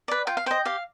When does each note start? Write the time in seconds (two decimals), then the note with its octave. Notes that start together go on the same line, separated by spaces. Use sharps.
0.08 B4 D5
0.27 F4 G5
0.37 F5
0.46 C5 D#5 G5
0.65 G4 F5